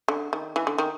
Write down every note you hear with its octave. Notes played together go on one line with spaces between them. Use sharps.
D3
D#3
E3
D3
D#3